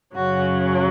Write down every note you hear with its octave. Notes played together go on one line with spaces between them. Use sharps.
F#2 C#3 F#3 F#4